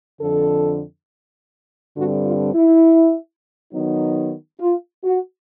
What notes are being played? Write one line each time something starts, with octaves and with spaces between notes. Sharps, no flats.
F2 D3 F3 A4
G2 D3 G3 C4 F#4
F4
E4
D#3 F#3 B3 D#4
F4
F#4